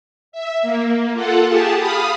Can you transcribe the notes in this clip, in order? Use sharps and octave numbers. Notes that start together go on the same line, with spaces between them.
E5
A#3
F4 A4 F#5
G4 G#4 A5
F5 B5 D#6